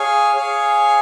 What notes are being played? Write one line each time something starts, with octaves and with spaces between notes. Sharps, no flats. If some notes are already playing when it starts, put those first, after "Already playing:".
Already playing: G#4 C#5 F5 G#5
G#4 C#5 F5 G#5